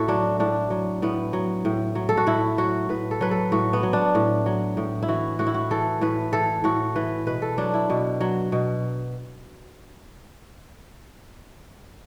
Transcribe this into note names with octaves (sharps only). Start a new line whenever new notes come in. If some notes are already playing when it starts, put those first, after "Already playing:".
Already playing: A2 E4 F#4 A4
F#3 D4
A2 D4
F#3
A2 B3
F#3
A2
F#3
A4
F#4
A2 E4
F#3 F#4
A2 B4
A4
F#3 B4
A4
A2 F#4
B3
F#3
D4
A2
F#3
A2
E4
E3 F#4
A2 F#4
E4
F#4
E3 A4
A2 B4
E3 A4
A2 F#4
E3 B4
B2 B4
A4
F#3 D4
E4
B2
F#3
B2